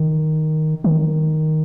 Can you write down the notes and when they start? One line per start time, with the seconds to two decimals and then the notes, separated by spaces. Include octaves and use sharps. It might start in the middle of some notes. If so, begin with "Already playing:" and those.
Already playing: D#3
0.84 D#3